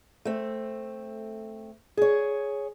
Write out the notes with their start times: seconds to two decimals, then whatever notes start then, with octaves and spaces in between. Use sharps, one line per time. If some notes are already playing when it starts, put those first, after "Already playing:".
0.25 A3 C4
1.97 G#4 C#5